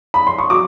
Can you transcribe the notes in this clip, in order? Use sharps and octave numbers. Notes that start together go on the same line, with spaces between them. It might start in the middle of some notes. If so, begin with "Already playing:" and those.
B5
C6
C#6
F#3 D6